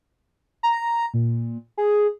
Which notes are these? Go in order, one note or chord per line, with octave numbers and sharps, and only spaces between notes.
A#5
A#2
G#4